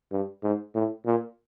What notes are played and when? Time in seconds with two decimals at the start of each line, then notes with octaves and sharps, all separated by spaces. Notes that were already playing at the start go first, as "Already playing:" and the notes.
0.12 G2
0.43 G#2
0.75 A2
1.06 A#2